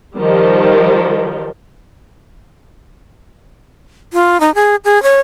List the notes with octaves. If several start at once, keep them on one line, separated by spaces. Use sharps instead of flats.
D#3 F3 G3
F4
D#4
G#4
G#4
C#5